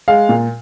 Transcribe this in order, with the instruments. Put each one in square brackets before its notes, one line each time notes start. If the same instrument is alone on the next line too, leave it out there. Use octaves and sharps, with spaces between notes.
[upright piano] G#3 F5
A#2